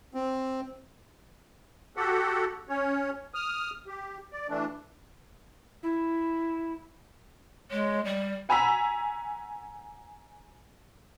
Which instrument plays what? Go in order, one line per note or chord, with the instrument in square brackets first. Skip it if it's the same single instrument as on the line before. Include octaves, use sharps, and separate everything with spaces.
[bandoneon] C4
[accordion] F#4 G4 A4 F#5
C#4 C#5
D#6 F6
G4
D5
E3 A3 D4
[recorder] E4
[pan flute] G#3 [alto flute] C#5
[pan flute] G3 [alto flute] D5
[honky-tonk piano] F#5 G#5 A#5 E6 B6